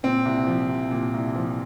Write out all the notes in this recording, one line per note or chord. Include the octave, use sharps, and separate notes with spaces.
A#2 C4
C2
F3
C2
A#2
C2
F3